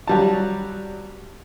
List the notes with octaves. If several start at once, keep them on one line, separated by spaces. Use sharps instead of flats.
F#3 G3 A5